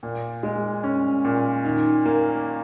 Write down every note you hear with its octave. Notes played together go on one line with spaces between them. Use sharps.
A#2
G#3
C#4
A#2
D#3
A#3